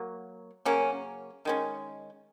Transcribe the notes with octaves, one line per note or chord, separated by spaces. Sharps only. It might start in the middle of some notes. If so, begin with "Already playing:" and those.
Already playing: F#3 A#3
C#3 F#3 A#3 C#4
D#3 G#3 C#4